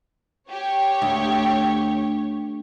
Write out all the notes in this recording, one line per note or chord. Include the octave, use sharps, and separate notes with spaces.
G4 C#5
D2